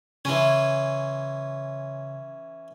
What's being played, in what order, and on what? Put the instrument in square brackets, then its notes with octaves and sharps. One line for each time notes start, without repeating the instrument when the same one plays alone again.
[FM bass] C#3 [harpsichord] E3 C#4 [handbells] C#5 G#5 C6